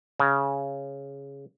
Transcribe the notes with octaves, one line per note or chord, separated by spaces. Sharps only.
C#3